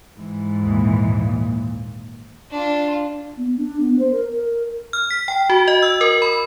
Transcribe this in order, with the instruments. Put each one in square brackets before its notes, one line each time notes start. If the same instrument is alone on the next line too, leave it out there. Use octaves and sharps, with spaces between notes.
[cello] G#2 E3
[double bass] D#2 A#2
[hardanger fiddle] D4 F4
[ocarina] B3
D4
B3
C5
A#4
A#4
[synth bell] F6
B6
G5
F#4
D#5
E6
A#4
B5